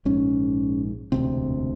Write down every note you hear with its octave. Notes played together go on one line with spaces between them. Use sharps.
A#1 G#2 C#4
E1 D2 C3 C4